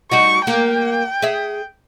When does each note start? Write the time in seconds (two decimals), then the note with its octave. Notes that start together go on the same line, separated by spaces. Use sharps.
0.12 G3 D#4 F#4 C#6
0.47 A#3 G4 A#4 G5
1.22 G#4 E5